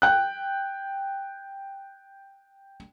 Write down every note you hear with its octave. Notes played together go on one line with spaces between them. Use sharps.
G5 F#6